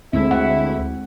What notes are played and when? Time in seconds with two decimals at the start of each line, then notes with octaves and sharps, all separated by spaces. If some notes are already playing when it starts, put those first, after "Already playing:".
0.13 D2 G#3 C4 E4
0.31 F#5